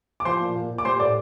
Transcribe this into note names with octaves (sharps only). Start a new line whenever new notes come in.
D6
F3 C5 C6
A#2
A#2
A#2
D6
G3 C5 C6
A2 D5 D6